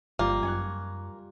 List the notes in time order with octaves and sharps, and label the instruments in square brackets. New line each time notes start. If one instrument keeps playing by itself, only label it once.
[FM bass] G1 [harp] G3 F4 [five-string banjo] A#3
[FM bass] F#2 [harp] G#5 C#6 F#6